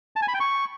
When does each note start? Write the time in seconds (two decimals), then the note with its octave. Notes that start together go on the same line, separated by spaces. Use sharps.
0.16 A5
0.22 G#5
0.28 B5
0.34 G5
0.40 C#6